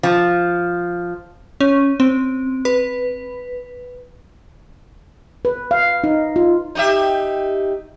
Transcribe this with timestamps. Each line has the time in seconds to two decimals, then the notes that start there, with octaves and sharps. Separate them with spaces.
0.03 F3
1.60 C#4
2.00 C4
2.65 B4
5.45 B4
5.71 F5
6.04 D#4
6.36 F4
6.75 D#4 G4 E5